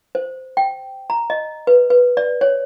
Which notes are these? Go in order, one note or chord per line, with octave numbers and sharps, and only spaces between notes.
C5
G5
A#5
D#5
B4
B4
D5
C#5